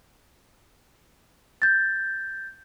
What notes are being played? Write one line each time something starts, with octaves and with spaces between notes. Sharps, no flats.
G6 A6